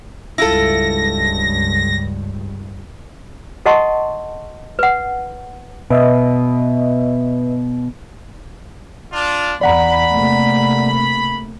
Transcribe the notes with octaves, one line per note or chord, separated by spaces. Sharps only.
C#2 G2 E4 F4 A4 A#6
A4 D#5 F#5 A5 C6 C#6
B4 F#5
B2 B4 D#5 E5
D4 F4
E2 D5 F#5 A#5 B5
C3 A3 A#3